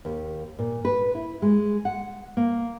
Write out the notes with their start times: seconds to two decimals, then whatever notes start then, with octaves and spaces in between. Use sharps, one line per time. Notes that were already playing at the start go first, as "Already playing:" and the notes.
0.05 D#2
0.59 A#2
0.85 B4
1.15 E4
1.42 G#3
1.85 F#5
2.37 A#3